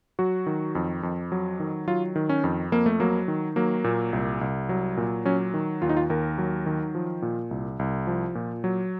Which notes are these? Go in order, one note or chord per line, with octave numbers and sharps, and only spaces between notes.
F#3 F#4
D#3
F2
F2
F#3
D#3
F#3 F4
D#3
C#4
F2
F2 A#3
A3
F#3 A#3
D#3
F#3 A#3
A#2
C2
C2
F#3
A#2
F#3 C#4
D#3
D#2 F4
D#4
F4
D#2 A#4
F#3
D#3
F3
A#2
C2
C2
F3
A#2
F#3